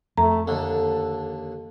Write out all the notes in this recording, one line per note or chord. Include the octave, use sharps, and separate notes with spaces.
F2 A3 A#5
D#2 D3 A4